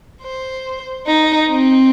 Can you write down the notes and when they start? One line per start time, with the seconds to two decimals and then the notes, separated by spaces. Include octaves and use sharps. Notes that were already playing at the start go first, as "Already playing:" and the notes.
0.22 C5
1.07 D#4
1.49 C4